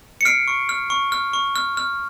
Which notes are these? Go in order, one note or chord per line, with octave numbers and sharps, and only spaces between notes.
C#7
F6 C7 D7
C#6
F6
C#6
F6
C#6
F6
F6